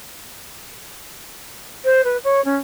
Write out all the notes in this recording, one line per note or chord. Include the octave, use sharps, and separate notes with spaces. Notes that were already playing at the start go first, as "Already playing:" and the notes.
C5
B4
C#5
C#4